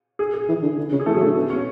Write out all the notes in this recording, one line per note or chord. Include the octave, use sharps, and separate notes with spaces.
G#4
G#4
E3
D3
D3
C#3
G#4
E3 A3 A4
F#3 G#4
D3 A3 A4
B2
C#4 C#5